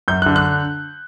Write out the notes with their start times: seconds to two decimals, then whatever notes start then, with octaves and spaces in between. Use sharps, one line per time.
0.08 F#2 G6
0.22 F#6
0.26 D3
0.36 F#6